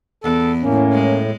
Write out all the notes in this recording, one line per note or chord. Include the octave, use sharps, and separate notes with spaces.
E2 B3 A4
A2 A#3 C#4
G#3